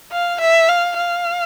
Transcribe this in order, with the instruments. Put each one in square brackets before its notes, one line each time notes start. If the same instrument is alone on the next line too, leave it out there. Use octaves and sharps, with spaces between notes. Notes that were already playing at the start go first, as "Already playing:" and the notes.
[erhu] F5
E5
F5
F5